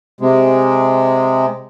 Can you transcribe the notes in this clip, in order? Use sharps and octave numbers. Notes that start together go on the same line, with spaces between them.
C3 G#3